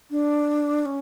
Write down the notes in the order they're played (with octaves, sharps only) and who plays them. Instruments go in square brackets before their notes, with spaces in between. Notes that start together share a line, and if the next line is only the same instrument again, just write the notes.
[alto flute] D4
C#4